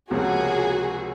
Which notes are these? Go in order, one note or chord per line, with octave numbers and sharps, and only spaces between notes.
C#2 C3 F3 A#3 C#4 F#4 G#4